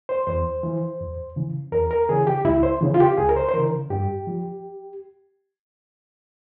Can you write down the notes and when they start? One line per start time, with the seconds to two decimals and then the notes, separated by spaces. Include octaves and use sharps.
0.09 C5
0.27 E2 C5
0.63 E3
1.00 E2
1.36 C#3 E3
1.72 E2 A#4
1.91 A#4
2.09 C#3 E3 G#4
2.27 G4
2.45 C#2 E4
2.63 C5
2.81 C#3 E3
2.94 F4
3.00 G4
3.18 C#2 G#4
3.29 A#4
3.36 C5
3.49 C5
3.54 C#3 E3 A#4
3.90 G2 G4
4.27 F3